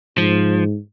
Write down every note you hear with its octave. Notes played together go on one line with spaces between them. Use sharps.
G#2 F3